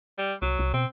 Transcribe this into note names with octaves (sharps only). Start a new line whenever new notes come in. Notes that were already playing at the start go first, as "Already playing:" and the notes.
G3
C2 F#3
C2
B2 C4